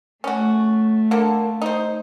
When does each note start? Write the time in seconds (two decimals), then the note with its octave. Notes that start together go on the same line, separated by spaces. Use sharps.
0.24 A3 C#4 F#4
1.11 D3 A#3
1.62 D#4 C5